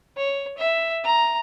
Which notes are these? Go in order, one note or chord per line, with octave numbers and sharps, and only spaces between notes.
C#5
E5
A#5